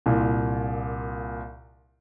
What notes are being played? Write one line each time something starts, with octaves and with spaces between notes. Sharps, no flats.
C2 A#2